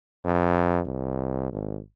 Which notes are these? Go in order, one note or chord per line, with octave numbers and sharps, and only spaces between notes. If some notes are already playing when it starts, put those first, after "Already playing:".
F2
C2
G#1